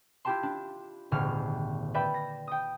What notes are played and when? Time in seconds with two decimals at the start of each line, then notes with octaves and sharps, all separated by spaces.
0.25 E4 F4 G4 G5 A5 C6
0.43 D4
1.11 D#1 G#1 D3 F6
1.94 B4 D5 E5 G5 B5
2.14 A#6
2.47 G5 D#6